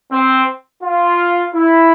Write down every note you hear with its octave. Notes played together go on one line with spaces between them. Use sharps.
C4
F4
E4